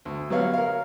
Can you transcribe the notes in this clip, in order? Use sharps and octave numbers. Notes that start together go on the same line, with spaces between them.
D2
F#3 G3 B3 C#5 F5
A#4 F5